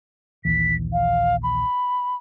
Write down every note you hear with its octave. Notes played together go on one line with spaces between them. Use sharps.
A#1 D#2 E3 B6
F5
B5